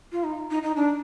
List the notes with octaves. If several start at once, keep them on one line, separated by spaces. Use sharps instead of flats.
F4
D#4
D#4
D#4
D4